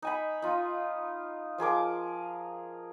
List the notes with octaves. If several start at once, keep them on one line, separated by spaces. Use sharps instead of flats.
D#4 G#5 B5
D#4 F4
F3 G#4 A#4 D6